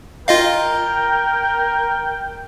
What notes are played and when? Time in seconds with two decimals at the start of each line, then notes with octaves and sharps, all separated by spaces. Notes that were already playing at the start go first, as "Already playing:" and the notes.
0.28 F4 A#4 D#5 F5 G5